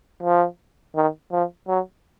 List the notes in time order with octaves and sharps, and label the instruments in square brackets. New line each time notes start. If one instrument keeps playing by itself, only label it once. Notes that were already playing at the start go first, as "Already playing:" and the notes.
[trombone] F3
D#3
F3
F#3